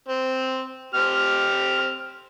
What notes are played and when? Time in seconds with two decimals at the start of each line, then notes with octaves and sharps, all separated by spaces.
0.09 C4
0.95 C4 G4 F6